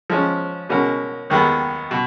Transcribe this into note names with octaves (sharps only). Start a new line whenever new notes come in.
F3 G#3 C#4
B2 G#3 C#4 F#4 A#4
D#2 D#3 G#3 B3
B2